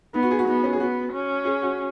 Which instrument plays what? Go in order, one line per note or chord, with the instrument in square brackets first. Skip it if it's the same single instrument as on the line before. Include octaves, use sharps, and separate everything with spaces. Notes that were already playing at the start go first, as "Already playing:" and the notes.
[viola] B3 [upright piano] D#4
[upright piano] F#4
G#4
F#4
[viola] B3 [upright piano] D#4
[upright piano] C#4
G#4
[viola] B3 [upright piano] F#4
[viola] C#4
[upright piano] G#4
F#4